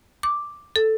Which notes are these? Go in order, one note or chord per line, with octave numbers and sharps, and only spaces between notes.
D6
A4